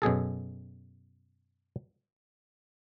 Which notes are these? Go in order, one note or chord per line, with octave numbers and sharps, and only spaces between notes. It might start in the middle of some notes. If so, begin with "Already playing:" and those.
F#2 B2 G#4 A4